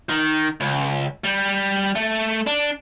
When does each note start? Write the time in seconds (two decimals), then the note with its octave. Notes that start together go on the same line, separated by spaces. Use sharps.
0.09 D#3
0.61 C#2
1.24 G3
1.95 A3
2.47 D4